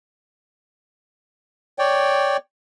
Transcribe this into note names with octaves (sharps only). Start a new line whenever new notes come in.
C#5 D5 G5